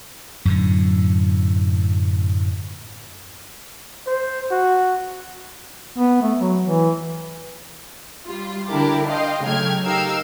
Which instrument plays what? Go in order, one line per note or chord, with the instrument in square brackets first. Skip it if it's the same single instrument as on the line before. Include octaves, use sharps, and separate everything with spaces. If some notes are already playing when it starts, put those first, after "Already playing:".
[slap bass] F#2 A2 D3
[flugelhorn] C5
F#4
[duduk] B3
A3
F#3
E3
[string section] G3 F4
D3 D4 E4 G4 A#4 D6
D#5 F5 G5 C6
C#3 F#3 A3 G5 F6 G#6
D#4 G4 A#4 F5 G5 E6